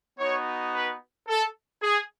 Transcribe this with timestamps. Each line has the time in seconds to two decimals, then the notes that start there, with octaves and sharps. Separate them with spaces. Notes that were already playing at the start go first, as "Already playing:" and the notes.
0.18 B3 D#4 F#4 C#5
0.73 B4
1.27 A4
1.82 G#4